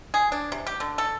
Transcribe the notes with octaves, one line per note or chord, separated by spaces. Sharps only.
G#4
D4
C3
G4
D3
A4